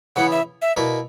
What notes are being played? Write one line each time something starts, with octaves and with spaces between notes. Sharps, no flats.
C#3 E3 B3 E4 F#5
E5
E5
B2 A#3 E4 B4 D5